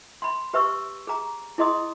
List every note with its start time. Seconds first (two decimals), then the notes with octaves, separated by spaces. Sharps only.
0.22 B5 C6
0.54 G4 B4 E5 C#6 E6
1.07 G#4 A#5
1.58 E4 G#4 D#5 C6 D#6